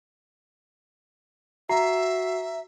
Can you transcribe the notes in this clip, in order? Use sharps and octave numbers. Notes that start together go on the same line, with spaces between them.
F#4 E5 A#5 C7